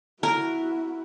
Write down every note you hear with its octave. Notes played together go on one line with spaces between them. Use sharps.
E4 F#4 A#4